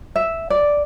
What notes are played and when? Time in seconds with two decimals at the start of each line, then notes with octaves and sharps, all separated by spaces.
0.16 E5
0.50 D5